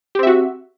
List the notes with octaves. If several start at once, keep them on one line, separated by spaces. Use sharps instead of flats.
C4 F#4 G4 E5